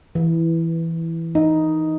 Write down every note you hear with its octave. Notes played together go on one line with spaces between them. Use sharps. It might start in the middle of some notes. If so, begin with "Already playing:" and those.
E3
D#4